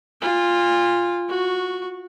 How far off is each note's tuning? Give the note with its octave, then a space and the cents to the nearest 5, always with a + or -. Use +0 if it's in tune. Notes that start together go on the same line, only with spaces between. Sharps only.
F4 +0 G#5 -35
F#4 -15 C#6 +0